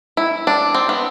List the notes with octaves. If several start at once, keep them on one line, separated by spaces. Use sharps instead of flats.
E4
D4
C4
B3